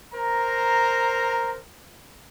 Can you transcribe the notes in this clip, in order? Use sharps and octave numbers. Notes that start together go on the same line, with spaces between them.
A#4 C5 A#5